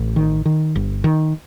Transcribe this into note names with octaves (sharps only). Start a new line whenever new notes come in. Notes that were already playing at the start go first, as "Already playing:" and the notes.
Already playing: A1
D#3
D#3
G1
D#3